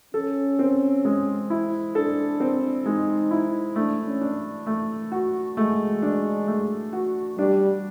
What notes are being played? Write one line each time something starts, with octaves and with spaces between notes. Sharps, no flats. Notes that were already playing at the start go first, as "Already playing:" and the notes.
C#4 A4
C4
G#3
E4
D4 A4
C4
G#3 D#4
E4
A3 D4
C#4
D4
A3
F#4
G#3 A3
D4
A3
F#4
G3 D4